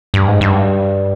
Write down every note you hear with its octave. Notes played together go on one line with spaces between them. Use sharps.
G2
G#2
G2